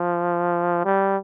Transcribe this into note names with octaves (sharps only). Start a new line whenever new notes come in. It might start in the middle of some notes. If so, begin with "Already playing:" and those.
Already playing: F3
G3